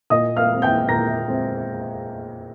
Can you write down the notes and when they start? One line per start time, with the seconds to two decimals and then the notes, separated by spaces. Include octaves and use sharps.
0.10 A#2 D#5 D#6
0.36 F5 F6
0.50 G#3 C4
0.62 G5 G6
0.89 A#2 A#5 A#6
1.28 G#3 C4